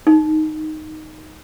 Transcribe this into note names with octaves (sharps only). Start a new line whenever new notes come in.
D#4